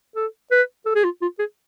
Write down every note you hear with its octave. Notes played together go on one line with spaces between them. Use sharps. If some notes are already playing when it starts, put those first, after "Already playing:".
A4
B4
A4
G#4
F4
F4
G#4